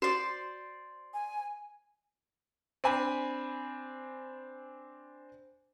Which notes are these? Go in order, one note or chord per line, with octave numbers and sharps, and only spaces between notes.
F#4 C5 D5
G#5
C4 D4 G#5 B5